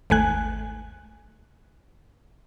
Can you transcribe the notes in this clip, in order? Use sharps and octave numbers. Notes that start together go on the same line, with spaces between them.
G#1 D#2 A3 G#5 F#6